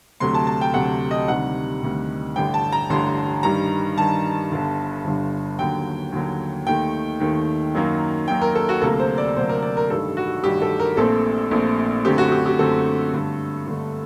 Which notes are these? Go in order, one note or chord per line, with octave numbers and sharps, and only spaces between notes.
D2 C3 F#3 A3 C6
A5
A5
G5
D2 C3 F#3 A3 F#5
D#5
D2 C3 D#3 G3 F#5
D2 C3 D#3 G3
A1 G2 D3 G5
A5
A#5
A1 G2 D3 C6
G2 D#3 G3 A#5
G2 D#3 G3 A5
G1 G2 D3
G1 G2 D3
D#2 D3 F#3 G5
D#2 D3 F#3
D#2 D#3 A3 G5
D#2 D#3 A3
F#2 D#3 F#3 A#3
F#2 D#3 F#3 A#3 G5
A#4
A4
F#4
D2 C3 F#3 A#3 A4
C5
D5
D2 C3 F#3 A#3 C5
A#4
D5
A#4
A1 G2 D#3 G3 A4
F#4
A1 G2 D#3 G3 G4
A4
A#4
A#1 A#2 A3 C4 A4
A#1 A#2 A3 C4
F#2 D3 A3 C4 G4
F#4
G4
G4
F#2 D3 A3 C4 A4
G2 D3 A3
G2 D3 A3